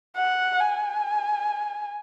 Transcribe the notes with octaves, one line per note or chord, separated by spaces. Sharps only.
F#5
G#5